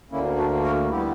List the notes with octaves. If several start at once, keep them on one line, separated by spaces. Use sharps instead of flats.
D2 D3 A#3 C#4 E4
D4 F#4
F#4 A#4
D3 G3 B3 E4 G4